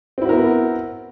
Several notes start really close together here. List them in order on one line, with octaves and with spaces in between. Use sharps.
C4 E4 F#4 A#4 B3